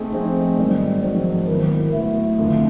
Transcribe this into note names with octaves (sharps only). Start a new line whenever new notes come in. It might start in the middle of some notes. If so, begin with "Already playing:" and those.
Already playing: A3 C4 D#4 G#4
F3 A3 C4 D#4 G#4
G#2 D#3 F#3 G3
G#2 D#3 F3 F#3
D#3 F#3 B3 E4
F#3 A3 B3 E4
F2 D3 F3